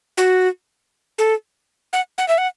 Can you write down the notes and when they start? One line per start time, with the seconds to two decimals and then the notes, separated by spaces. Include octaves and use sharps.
0.17 F#4
1.18 A4
1.93 F#5
2.18 F#5
2.28 E5
2.38 F#5